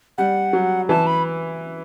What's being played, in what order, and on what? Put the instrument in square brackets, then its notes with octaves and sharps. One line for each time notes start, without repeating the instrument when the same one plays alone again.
[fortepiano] G3 [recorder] F#5
[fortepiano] F#3
[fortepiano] E3 [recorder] A5
[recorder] B5